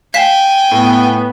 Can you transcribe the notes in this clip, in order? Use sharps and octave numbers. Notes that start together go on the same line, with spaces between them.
F5 G5 G#5 B6 E7
A2 B3